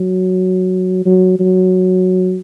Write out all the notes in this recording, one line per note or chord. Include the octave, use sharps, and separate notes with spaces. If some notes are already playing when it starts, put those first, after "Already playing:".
Already playing: F#3
F#3
F#3